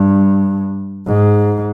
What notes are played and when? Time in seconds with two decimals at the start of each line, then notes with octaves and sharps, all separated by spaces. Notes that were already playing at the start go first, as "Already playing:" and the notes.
Already playing: G2
1.07 G#2